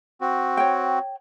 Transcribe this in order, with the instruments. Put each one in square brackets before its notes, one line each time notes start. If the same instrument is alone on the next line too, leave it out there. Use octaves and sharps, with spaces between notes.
[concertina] C4 F#4
[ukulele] C#5 G5